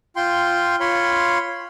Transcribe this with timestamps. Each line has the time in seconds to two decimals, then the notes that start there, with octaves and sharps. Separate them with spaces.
0.16 F4 G5 C6
0.80 F4 C#5 B5 C6